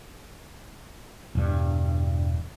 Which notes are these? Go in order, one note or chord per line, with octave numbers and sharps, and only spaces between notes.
E1 G2